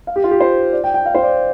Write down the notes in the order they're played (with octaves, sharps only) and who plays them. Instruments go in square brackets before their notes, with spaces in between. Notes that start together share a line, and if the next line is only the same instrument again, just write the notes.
[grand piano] F5
G4
F4
G4
C5
D5
G5
G5
F5
C5
D5